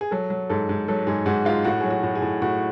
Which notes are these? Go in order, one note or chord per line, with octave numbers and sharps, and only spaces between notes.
G#4
F#3 A4
F#3
G#2 A4
G#2
F#3 A4
G#2 G#4
G#2 F#4
G#2 F4
A2 F#4
F#3 G#4
F#4
A2
G#4
A2
A2 F#4